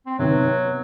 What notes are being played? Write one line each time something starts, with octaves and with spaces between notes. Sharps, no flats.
C4
C3 D#3 F#3 B3
B3